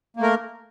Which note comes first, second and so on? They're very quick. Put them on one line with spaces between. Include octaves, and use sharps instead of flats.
A#3 A3 A#4